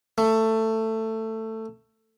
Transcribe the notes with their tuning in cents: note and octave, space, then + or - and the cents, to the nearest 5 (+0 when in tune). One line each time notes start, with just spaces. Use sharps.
A3 +15